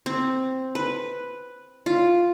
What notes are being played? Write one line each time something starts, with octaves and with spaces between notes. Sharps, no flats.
C4
B4
F4